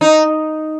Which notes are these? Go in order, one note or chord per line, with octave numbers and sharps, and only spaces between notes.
D#4